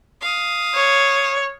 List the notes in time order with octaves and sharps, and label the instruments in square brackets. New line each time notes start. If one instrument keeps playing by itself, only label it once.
[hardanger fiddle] F5 D#6
[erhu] C#5